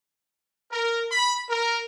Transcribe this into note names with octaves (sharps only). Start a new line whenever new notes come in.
A#4
B5
A#4